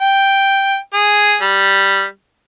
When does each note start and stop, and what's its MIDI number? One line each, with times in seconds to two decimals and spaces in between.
0.01 0.77 79
0.94 1.36 68
1.42 2.04 55